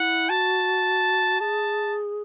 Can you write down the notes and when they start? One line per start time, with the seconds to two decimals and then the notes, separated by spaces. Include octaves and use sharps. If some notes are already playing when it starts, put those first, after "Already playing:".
Already playing: E4 F#5
0.29 F#4 A5
1.40 G#4 A5